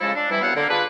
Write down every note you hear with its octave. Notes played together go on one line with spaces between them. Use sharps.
C#3 F3 G#3 E4 A4
D4
C3 E3 G3 E4
C2 F#3 B3 E4 F5 F#5
D3 A#3
D4 F4 G#4 B4